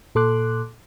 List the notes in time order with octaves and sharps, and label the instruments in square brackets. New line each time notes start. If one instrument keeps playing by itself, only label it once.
[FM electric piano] A#2 A4 C6 D6 F#6